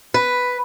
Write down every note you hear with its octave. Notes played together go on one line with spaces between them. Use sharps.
B4